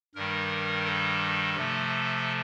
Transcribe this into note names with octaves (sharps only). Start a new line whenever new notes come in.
G2 D#3 G3 A#4
A4
C3 F3 A3